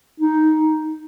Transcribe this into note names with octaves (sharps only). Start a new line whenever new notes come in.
D#4